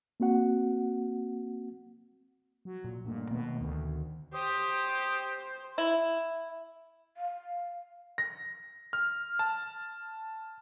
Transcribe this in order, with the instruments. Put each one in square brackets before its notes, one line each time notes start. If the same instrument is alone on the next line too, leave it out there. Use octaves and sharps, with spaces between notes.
[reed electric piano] A#3 C4 F#4 F#5
[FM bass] F#3
[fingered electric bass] A#2
[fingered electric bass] G2 A3 [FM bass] A#2
[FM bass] B2 [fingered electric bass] D#3 A3 A#3
[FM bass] D2 [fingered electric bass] D#3
[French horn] G4 [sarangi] C5 [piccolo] D#6
[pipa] E4
[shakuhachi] F5
[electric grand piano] A#6
F6
A5